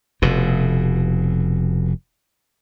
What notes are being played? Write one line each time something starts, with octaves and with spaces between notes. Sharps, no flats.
F1 B2